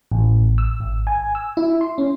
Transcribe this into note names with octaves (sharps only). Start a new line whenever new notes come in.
A1
E6
G#1
G#5
E6
E4
C6
C#4